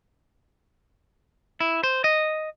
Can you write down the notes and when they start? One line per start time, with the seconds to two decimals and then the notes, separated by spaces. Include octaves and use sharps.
1.61 E4
1.84 C5
2.04 D#5